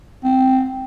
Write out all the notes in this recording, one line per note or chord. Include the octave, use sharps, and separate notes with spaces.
C4